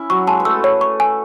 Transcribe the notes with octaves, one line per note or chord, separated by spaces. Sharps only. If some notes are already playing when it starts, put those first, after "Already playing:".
Already playing: C#4 E4
F#3 F#4 C#6
G#3 G#4 A5
B4
A3 A4 E6
C#5
C#6
G#5